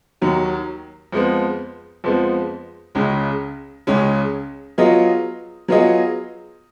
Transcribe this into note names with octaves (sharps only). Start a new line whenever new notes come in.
D#2 D#3 F#3
F2 F3 G#3 B3
F2 F3 G#3 B3
C#2 C#3 G#3 C#4
C#2 C#3 G#3 C#4
F#3 B3 F4 G#4 D#5
F#3 B3 F4 G#4 D#5